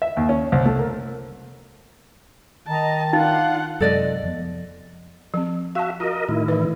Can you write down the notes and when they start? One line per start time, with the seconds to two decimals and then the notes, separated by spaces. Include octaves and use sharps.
0.02 E5
0.17 D#2
0.29 C#4
0.52 C2
0.65 A3
0.79 A#4
2.68 D#3 D#5 A5 A#5
3.13 D4 D#4 F4 F5 F#5
3.80 F#2 C3 G#3 A4 D5 D#5
4.23 F2 F3 B3
5.34 F3 C4
5.75 F#4 E5 F5 A5
6.00 F4 F#4 A#4 D#5
6.29 A2 D#3 E4
6.48 E3 B4